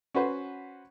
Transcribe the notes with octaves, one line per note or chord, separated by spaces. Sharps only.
C#4 F#4 B4 C5